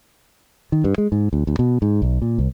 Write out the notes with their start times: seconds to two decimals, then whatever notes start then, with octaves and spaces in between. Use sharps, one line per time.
0.72 D#3
0.84 G2
0.98 G#3
1.12 G#2
1.33 D2
1.47 D2
1.59 B2
1.82 G#2
2.02 B1
2.22 A#2
2.38 C2